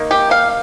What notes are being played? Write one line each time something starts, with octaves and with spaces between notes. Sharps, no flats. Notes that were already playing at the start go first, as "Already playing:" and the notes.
Already playing: D#3 A#3
G4
F5